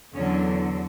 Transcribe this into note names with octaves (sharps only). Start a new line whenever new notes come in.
E2 D3 F#3 C#4